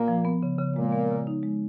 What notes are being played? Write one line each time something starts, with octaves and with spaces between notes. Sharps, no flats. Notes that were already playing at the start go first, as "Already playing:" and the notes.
Already playing: A#2 A#3
F3
B3
C#3
C#3
A#2 G#3 A#3
B3
C#3
D#4
G#3